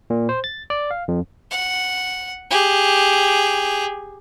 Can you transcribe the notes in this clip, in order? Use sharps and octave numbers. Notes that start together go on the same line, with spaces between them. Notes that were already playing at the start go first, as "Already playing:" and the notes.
A#2
C5
A6
D5
F5
F2
F#5
G4 G#4